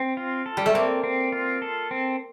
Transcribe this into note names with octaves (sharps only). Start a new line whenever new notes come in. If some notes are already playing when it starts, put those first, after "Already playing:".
Already playing: C4
F4
A4
G3
A3
A#3 C4
C4
F4
A4
C4